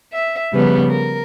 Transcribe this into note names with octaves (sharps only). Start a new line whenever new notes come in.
E5
C#3 F3 G3 B3 B4
A#4